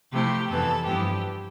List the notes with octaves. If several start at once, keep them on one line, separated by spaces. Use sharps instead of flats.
C3 F3 A3 E4 G4
F2 C3 E3 B3 A4
G2 F3 B3 E4 G4